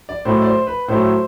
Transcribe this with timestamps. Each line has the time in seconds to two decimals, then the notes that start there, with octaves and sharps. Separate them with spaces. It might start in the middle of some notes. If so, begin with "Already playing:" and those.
0.09 D5
0.25 A2 F#3 A3 C5
0.42 D5
0.46 C5
0.67 B4
0.88 A2 F#3 A3 C5